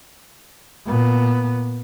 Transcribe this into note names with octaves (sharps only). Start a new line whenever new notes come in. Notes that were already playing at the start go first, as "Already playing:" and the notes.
A#2 B3